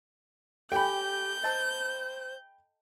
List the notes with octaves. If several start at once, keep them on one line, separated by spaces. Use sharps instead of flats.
G4 A4 C#5 G5 G#5 B5 G6
C5 D#5 A5 A#5